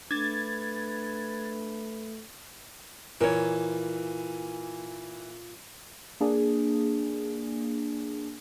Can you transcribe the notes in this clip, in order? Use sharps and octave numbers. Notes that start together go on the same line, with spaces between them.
A3 D4 B4 G#6 A6
A#2 E3 A#4 C#5
A#3 D4 G#4